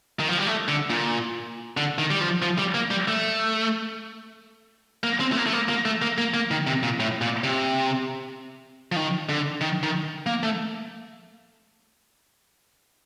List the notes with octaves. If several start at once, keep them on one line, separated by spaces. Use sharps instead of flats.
D#3
F3
G3
A3
D3
A#2
D3
D#3
G3
F3
F3
G3
A#3
G3
A3
A#3
C4
A3
A#3
A3
A#3
A#3
A3
A#3
A#3
A#3
D#3
C3
A#2
A2
A#2
C3
F3
D#3
D3
D#3
D#3
A#3
A3